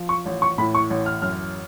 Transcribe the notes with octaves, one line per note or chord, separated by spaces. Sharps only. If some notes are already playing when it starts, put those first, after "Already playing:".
Already playing: F3
C#6
A1
C#6
A2 B5
C#6
A1
F6
F#2 F6